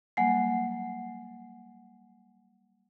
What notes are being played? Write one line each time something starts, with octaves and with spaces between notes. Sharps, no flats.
F#3 G3 A#3 F#5 G#5 C7